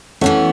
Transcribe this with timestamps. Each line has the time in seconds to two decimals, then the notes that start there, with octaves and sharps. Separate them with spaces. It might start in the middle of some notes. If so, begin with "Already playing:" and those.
0.21 E3 A3 B3 C#4 F#4